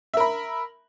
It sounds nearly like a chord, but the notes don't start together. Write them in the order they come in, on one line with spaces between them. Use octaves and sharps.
E5 A#4 B5